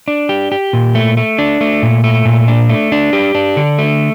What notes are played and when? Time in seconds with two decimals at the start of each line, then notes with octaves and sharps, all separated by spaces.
0.08 D4
0.29 G4
0.52 G4
0.73 A#2
0.95 A3
1.17 A3
1.38 D4
1.61 A3
1.83 A#2
2.04 A3
2.25 A#2
2.48 D4
2.69 A3
2.92 D4
3.13 G4
3.35 D4
3.57 D3
3.78 A3